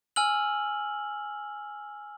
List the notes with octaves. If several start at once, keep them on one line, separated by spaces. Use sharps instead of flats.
G#5 E6 F6 F#7